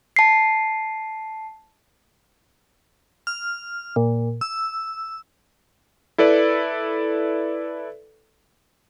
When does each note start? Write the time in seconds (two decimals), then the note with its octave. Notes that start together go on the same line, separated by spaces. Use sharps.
0.16 A5 C7
3.27 F6
3.96 A#2
4.41 E6
6.18 E4 A4 B4 D5